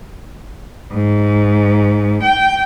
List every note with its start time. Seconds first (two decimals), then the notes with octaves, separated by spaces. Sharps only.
0.92 G#2
2.24 G5